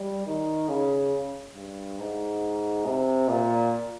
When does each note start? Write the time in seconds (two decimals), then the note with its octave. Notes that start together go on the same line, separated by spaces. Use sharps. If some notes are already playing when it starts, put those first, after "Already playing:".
Already playing: G3
0.26 D#3
0.69 C#3
1.55 G2
1.99 G#2
2.86 C3
3.29 A#2